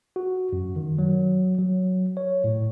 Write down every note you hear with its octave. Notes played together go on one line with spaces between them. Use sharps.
F#4
F#2
D#3
F#3
F#3
C#5
A2